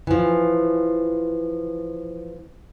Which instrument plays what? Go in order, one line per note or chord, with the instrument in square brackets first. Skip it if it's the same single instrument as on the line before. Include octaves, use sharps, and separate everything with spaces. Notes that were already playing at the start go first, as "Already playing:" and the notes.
[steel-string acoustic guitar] E3 F3